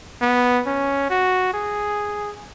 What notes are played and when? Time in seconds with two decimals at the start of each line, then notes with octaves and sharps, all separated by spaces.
0.21 B3
0.67 C#4
1.10 F#4
1.54 G#4